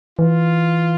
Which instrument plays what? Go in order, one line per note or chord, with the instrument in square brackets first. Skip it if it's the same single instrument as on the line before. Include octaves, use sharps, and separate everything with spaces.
[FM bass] E3 [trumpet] F4